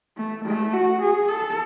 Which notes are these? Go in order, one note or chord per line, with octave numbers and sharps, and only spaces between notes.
A3
A3
F#4
G#4
A4